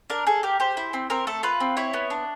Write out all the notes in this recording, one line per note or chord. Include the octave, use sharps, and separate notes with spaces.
D4 A#4
G#4 A4
G4 A#4
G4 C5
E4
C4
C4 A#4
A3 A4
F4 B4
C4
E4 C#5
B3
D4